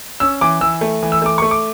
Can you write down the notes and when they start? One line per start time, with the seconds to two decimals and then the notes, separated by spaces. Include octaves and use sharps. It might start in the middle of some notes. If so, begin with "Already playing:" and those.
0.20 C#4 E6
0.41 E3 D6
0.61 E3 E6
0.81 A3
1.03 E3
1.12 E6
1.22 A3 D6
1.38 A3 C#6
1.51 D6